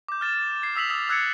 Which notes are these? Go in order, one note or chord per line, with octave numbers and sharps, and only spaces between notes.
D6 G6
F6 A6 E7
G#6 C7
D#6 E6 B6 F7 F#7
D#6 E6 A6
D#6 E6 F#6 G#6 A6 C#7